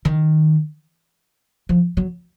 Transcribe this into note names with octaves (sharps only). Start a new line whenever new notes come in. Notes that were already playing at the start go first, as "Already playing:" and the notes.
D#3
F3
F#3